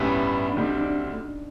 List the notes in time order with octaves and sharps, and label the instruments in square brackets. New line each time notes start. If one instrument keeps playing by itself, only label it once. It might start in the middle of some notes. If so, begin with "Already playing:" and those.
Already playing: [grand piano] A1 G2 E3 G3 B3 [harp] C#4
[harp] D4
[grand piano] D2 D3 G3 C4 [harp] D#4
[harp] D4